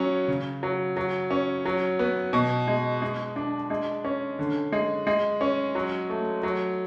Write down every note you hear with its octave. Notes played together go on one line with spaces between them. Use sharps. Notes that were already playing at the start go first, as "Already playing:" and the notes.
Already playing: F#3 C#4
C#3
F#3
F#3
C#4
F#3
B3
B2
G#3
G#3
D4
G#3
C#4
D3
G#3
G#3
C#4
F#3
A3
F#3